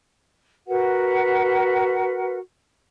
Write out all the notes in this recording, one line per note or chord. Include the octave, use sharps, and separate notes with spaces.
F#4 A#4 B4 F#5